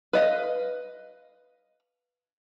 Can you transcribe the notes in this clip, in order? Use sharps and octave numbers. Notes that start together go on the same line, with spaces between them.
B4 D#5 F5